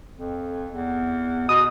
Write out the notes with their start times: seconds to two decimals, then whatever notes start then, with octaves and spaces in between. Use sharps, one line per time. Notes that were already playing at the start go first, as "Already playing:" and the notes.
0.18 F2
0.72 E2
1.49 B2 D#6